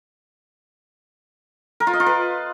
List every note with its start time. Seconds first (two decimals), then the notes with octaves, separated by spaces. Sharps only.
1.80 A#4
1.87 F4
1.93 D#5
2.00 F4
2.06 B4